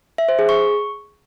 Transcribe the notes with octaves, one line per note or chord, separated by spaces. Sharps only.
E5
C5
G#4
C#6